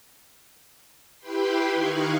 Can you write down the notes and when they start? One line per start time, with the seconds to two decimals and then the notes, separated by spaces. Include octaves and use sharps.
1.19 E4 G4 B4 G5 B5 C6
1.71 D#3 D#4 F5 C#6 F#6 G#6